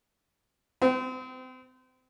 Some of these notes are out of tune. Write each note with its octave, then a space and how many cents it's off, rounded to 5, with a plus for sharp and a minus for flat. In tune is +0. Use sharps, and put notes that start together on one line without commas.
C4 -35 G5 -20